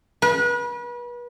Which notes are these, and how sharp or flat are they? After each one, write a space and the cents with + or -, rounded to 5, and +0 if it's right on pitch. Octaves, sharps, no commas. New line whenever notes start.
B4 -35